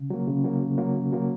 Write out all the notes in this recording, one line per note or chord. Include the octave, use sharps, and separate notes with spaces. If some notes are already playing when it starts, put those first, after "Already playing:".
Already playing: C#3
F#3 A#3
C#3
F#3 A#3
C#3
F#3 A#3
C#3
F#3 A#3